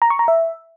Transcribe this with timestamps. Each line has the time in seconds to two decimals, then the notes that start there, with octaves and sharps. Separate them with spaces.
0.02 A#5
0.10 C#6
0.19 A#5
0.28 E5